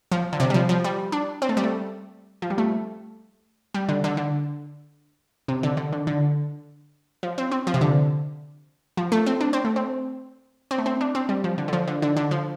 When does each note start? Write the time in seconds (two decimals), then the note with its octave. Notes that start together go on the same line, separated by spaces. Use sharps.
0.12 F3
0.33 D3
0.40 C3
0.50 G3
0.54 F3
0.69 F3
0.84 G3
1.12 D4
1.42 C4
1.49 A3
1.57 G3
1.64 A3
2.42 F3
2.50 G3
2.58 A3
3.74 G3
3.89 D3
4.04 D3
4.17 D3
5.48 C3
5.63 D3
5.77 D3
5.92 D3
6.07 D3
7.23 F3
7.38 C4
7.51 C4
7.67 F3
7.74 C3
7.81 D3
8.97 F3
9.12 A3
9.26 C4
9.41 D4
9.53 C4
9.65 A3
9.76 C4
10.71 C4
10.78 A3
10.86 C4
11.01 D4
11.15 C4
11.29 G3
11.44 F3
11.58 D3
11.68 D3
11.73 F3
11.88 D3
12.02 D3
12.16 D3
12.31 F3